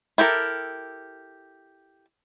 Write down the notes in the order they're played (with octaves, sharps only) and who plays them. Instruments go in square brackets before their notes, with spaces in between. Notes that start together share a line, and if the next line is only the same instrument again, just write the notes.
[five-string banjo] E4 G4 A4 A#4